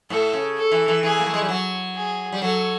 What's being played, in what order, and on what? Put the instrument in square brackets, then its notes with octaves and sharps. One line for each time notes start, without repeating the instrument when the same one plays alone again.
[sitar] A2 [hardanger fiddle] A4
[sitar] C#3
[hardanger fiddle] A4
[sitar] E3
E3
[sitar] E3 [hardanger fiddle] G#4
[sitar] A#3
A3
G#3
G3
F#3
[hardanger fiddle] G#4
[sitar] G3
[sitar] F#3 [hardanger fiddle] A4